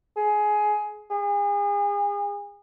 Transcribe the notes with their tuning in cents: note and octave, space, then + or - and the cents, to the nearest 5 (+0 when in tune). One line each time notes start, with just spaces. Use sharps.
G#4 +15
G#4 -35